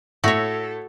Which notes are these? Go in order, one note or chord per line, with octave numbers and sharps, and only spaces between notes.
A2 F#4 A4 C#5 E5 E6 A#6